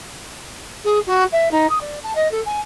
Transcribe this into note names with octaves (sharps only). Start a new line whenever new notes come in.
G#4
F#4
E5
D#4
D#6
D5
A5
D#5
A4
G#5